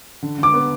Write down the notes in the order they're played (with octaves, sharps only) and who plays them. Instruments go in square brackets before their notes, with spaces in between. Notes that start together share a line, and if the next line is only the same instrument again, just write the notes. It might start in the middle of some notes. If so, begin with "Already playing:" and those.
[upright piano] D3
[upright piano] D3 [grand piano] D6
[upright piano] B3